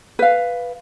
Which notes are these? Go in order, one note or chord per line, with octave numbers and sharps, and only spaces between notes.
B4 F5